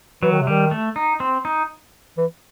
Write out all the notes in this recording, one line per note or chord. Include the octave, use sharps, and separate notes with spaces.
E3 F#3
D#3
C3
D#3 G3
A3
D#4
C4
D#4
E3